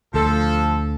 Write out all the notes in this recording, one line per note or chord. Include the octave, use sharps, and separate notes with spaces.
D2 F3 A4